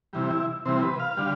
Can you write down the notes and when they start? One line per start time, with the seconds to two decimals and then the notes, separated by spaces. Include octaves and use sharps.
0.13 C3 E3 G3
0.31 E4
0.65 C3 E3 G3 C4
0.83 B4
1.00 F5
1.17 D3 G3